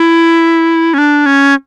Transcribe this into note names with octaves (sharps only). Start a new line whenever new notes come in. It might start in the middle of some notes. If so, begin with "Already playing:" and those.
Already playing: E4
C#4
D4
C#4